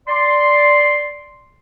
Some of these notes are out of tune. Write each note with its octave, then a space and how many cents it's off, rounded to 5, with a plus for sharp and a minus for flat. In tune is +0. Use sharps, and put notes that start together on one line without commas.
D5 +0 C6 +0